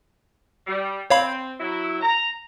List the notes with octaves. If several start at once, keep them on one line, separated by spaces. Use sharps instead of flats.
G3
C4 C#5 F5 B5
F#3 E4
A#5